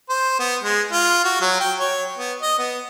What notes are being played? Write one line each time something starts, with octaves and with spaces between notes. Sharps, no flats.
C5
B3
G#3
F4
F#4
F#3
G5
C#5
B3
D#5
B3